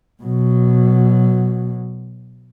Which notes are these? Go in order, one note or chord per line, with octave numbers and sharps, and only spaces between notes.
B2 F#3